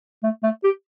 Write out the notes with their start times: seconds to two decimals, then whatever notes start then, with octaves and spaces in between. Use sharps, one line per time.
0.23 A3
0.43 A3
0.64 G4